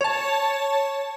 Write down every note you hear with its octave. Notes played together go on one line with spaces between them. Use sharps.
C#5 A5